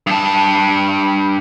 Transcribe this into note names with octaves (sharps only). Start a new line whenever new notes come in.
G2 A5